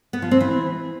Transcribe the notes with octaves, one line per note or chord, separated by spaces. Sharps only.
B3
F3
C4
E3